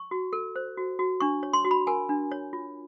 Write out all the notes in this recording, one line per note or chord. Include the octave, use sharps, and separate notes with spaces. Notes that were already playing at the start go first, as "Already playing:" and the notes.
Already playing: C#6
F#4
A4
C5
F#4
F#4
D4 C#6
C#5
C6
F#4
B5
A#4 G#5
D4
C#5
F4